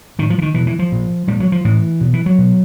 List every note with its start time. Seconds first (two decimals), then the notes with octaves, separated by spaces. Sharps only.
0.19 A2 D#3
0.30 F3
0.38 E3
0.42 D#3
0.54 B2 E3
0.67 E3
0.79 F3
0.92 A#2
1.28 A#2 G3
1.40 F#3
1.52 F3
1.65 A2 E3
2.01 B2
2.13 E3
2.26 F#3
2.38 B2